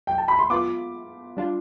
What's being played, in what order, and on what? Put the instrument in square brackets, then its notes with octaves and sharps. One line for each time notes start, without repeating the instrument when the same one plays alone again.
[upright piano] G5
A5
B5
C6
[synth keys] B3 F4 B4 [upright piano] D6
[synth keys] G3 D4 F4